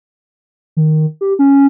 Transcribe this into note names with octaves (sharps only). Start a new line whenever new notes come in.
D#3
G4
C#4